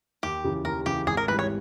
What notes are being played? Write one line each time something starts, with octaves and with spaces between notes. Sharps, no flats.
D#2 G4
C#3 E3
D#2 A#4
C#3 E3 G4
G#1 G#4
A#4
G#2 E3 G3 B4
C#5